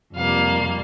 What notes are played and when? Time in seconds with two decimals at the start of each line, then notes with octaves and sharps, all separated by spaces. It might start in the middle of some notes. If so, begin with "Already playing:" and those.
0.15 F2 C3 G3 A#3 F5